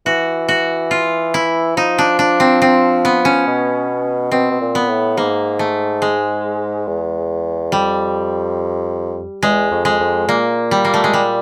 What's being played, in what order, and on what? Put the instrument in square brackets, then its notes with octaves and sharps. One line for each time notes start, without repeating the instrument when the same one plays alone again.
[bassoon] E3 [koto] F#4
[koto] F#4
F4
E4
[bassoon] F3 [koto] D#4
[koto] D4
D4
C4
C4
B3
C#4
[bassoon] B2
[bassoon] B2 [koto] C4
[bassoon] B2
A#2
[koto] B3
[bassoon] A2
[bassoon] G#2 [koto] A#3
[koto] A3
G#3
[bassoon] E2
[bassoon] F2 [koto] G3
[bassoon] E2 [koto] G#3
[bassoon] F2
[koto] G#3
[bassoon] F2
[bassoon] A#2 [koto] A#3
[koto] G3
A#3
A3
G#3
G3